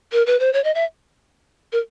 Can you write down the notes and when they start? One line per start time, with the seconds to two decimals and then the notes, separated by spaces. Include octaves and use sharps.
0.12 A#4
0.26 B4
0.40 C5
0.53 C#5
0.64 D#5
0.75 E5
1.72 A#4